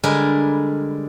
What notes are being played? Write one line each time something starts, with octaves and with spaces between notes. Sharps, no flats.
D3 G3 G#3 G#4 A#4 B4